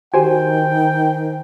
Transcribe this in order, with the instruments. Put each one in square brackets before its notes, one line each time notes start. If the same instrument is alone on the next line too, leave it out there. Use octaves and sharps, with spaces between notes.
[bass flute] D#3 [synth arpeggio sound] F#4 G4 [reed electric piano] C5 G#5 [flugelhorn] G5